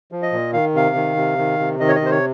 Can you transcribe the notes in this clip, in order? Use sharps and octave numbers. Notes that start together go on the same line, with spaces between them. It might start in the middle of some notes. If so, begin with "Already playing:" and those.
F3
D#5
A#2
D#3 F5
C3 F5
D#3
C3
D#3
C3
D#3 D#5
C#5
D#5
C3 C5
C#5